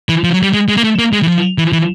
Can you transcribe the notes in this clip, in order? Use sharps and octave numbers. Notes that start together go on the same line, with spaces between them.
E3
F3
F#3
G3
G#3
G#3
A#3
A3
A#3
G#3
E3
F3
E3
E3